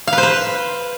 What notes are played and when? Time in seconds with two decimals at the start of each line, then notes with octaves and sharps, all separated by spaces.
0.07 F5
0.13 B4
0.18 C5
0.23 B4